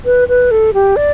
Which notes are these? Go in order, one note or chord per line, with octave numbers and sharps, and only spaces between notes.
B4
B4
A4
G4
D5